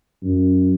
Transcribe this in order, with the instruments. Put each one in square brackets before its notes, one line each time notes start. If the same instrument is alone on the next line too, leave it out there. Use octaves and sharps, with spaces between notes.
[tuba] F#2